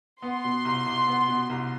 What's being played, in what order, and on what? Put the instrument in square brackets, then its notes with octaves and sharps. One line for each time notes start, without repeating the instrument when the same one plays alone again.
[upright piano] B3 [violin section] C6
[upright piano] B2
C2
C2
B3
B2
C2